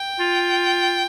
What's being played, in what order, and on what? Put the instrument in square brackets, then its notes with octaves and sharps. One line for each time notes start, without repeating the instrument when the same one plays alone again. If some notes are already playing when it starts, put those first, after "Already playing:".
Already playing: [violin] G5
[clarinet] F4